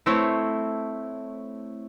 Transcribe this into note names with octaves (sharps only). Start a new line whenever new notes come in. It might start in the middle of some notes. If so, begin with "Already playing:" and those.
A3 C4 E4 C5 C#5